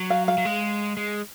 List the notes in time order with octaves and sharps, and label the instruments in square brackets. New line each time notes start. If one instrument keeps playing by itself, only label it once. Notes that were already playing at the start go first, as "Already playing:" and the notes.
Already playing: [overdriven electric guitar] F#3
[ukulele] F5
F5
[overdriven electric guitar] F#3
G#3
G#3